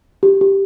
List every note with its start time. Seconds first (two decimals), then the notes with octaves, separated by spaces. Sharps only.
0.23 G4
0.41 G4